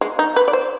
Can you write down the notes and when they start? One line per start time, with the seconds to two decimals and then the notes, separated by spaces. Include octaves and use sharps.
0.01 G#3
0.19 D#4
0.36 B4
0.48 D5
0.53 C5